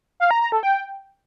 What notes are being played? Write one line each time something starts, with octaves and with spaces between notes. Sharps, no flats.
F5
A#5
A#5
A4
G5